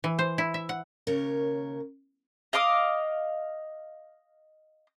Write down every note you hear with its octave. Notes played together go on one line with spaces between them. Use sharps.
E3
C5
E4
E5
F#5
D#2 C#3 A#4 C#5
D#5 F5 D6 D#6